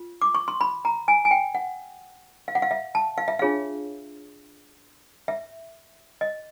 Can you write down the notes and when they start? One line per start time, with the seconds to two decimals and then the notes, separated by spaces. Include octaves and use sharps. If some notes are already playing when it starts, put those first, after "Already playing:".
Already playing: F4
0.22 D6
0.35 C#6
0.48 C6
0.61 B5
0.85 A#5
1.08 G#5
1.25 G#5
1.31 G5
1.55 F#5
2.48 F5
2.55 F#5
2.62 F5
2.71 E5
2.95 A5
3.18 F5
3.28 E5
3.39 D4 F4 G#4 C#5 F5
5.28 E5
6.21 D#5